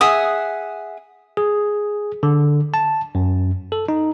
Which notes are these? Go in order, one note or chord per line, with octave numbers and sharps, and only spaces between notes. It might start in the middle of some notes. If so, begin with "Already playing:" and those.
G#4 E5 F#5 D#6
G#4
D3
A5
F#2
A4
D#4